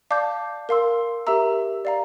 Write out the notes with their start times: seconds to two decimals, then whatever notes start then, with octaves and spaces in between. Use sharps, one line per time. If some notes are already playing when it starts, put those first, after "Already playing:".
0.11 D5 F5 A5 D6 G6
0.69 A#4 F5 C6 E6
1.27 G4 A#4 E5 A#5 E6
1.85 D5 F5 A#5